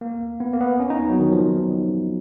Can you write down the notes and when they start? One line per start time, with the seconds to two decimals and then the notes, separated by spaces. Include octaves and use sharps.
0.01 A#3
0.40 B3
0.53 A#3
0.60 B3
0.80 C#4
0.90 D#4
1.00 B3
1.10 F#3
1.19 D#3
1.32 F3